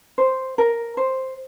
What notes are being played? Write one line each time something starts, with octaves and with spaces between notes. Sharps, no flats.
C5
A#4
C5